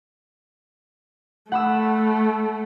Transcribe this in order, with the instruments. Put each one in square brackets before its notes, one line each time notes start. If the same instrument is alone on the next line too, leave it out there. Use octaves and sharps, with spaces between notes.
[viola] A3 [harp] F#5 B5 E6